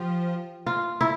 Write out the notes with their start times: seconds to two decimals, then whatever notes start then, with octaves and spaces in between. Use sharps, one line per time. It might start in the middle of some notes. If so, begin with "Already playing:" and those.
Already playing: F3 F4 G4
0.66 F4
1.01 E4